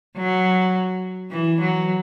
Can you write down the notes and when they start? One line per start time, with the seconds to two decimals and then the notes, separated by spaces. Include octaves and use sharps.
0.17 F#3
1.31 E3
1.60 F#3